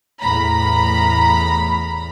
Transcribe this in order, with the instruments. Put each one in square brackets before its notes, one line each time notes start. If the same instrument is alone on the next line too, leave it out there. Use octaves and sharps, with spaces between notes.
[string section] E2 A2 A#5 B5